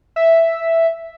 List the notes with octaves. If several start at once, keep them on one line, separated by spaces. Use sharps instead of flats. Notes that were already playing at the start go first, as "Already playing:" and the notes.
E5